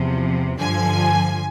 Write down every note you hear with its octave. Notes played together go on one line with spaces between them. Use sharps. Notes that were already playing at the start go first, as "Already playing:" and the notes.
Already playing: E2 C3 F3
G2 D3 F3 G#5